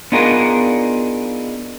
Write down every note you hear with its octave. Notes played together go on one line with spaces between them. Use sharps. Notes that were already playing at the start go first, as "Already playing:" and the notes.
B3 D4 D#4 F4 G#4 A#4